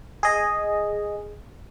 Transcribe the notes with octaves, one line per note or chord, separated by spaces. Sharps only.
G#4 D#5